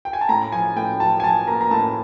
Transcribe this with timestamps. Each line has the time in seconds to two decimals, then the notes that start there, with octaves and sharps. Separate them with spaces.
0.05 G5
0.13 G#5
0.21 A5
0.29 A2 A#5
0.52 F3 G#5
0.76 A2 G5
1.00 F3 A5
1.20 G#5
1.24 F3 A5
1.47 A#3 A#5
1.61 A#5
1.71 A2 A5